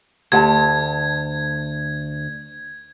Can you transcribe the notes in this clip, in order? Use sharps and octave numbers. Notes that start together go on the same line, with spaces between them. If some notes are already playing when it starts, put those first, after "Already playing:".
D2 G4 F#5 A5 G#6